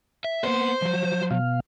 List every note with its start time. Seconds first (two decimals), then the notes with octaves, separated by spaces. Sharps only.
0.24 E5
0.44 A#3 B3 C5
0.82 F3 F#3
1.31 B2 F5